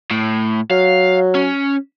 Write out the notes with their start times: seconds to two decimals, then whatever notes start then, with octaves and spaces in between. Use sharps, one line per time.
0.11 A2
0.70 F#3 F5
1.35 C#4